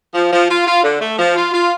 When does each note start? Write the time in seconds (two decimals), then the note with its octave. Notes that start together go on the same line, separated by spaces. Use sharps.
0.14 F3
0.32 F3
0.49 F4
0.66 F4
0.83 D3
1.01 A3
1.18 F3
1.35 F4
1.53 F4